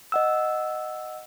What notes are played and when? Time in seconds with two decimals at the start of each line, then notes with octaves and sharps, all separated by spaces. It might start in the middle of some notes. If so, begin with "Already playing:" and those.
0.12 D#5 F#5 E6